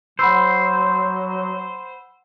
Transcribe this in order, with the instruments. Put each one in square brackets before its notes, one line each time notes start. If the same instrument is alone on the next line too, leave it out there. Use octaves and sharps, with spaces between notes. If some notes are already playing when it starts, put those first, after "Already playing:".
[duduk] F#3 [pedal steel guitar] C5 [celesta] F#5 B5 E6